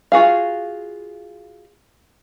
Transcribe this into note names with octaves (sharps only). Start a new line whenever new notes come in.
F4 F#4 G#4 F5